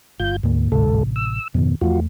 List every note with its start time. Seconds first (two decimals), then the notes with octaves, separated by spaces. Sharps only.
0.20 G1 F4 G6
0.43 D2 G#2 A#3
0.72 A1 D2 G#2 C3 A4
1.16 E6
1.54 F2 G#2 B2 D#3
1.81 E2 F3 A3 F4 F#4